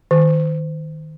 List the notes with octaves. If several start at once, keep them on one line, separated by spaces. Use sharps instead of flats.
D#3